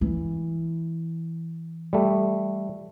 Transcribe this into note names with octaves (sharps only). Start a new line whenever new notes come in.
E3
G3 A3